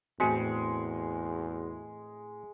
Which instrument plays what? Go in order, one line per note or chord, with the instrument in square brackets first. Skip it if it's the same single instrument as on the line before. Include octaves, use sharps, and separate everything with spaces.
[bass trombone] E2 [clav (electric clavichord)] A2 C4 [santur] G#3 [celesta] F#4 B6 C#7